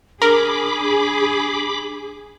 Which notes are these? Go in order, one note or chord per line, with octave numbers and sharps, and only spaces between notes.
D4 G#4 A#4 B5 D6